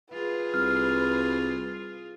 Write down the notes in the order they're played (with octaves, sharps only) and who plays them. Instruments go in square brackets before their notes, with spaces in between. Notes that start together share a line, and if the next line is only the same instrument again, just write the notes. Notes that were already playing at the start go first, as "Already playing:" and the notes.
[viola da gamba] F4 G#4 [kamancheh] B4
[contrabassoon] C2 [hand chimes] F6